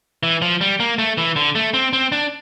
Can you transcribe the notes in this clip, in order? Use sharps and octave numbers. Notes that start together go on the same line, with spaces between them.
E3
F3
G3
A#3
A3
E3
D3
A3
C4
C4
D4